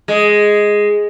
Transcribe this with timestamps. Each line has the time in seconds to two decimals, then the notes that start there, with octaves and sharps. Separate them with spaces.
0.08 G#3